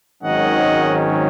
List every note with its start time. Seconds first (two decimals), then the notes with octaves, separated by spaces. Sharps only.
0.23 G#1 G#2 D#3 F#3 C#4 D#5 F#5